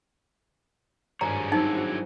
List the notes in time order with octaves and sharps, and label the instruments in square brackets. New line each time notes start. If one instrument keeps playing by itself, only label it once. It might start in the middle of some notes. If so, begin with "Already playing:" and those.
[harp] G#1 G2 [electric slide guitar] D4 G#4 C#5 [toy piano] A#5
[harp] F#3 C4 E4 [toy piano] D#4
[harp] F#4